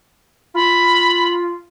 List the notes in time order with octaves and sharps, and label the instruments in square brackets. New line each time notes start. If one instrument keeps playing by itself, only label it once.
[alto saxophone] F4 [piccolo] B5